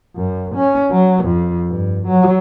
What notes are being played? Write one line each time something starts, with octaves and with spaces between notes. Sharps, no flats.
F#2
C#4
F#3
F2
G2
F#3